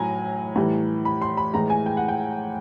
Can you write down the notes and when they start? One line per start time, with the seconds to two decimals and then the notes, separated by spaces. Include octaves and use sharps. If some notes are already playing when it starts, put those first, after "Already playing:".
Already playing: A2 F#3 G#5 A#5
0.56 A2 E3 G3
1.05 B5
1.22 C6
1.37 B5
1.54 A2 E3 G#3 A#5
1.70 G#5
1.86 G5
1.97 F#5
2.09 G5